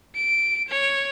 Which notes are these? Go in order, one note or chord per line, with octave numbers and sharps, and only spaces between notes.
D7
C#5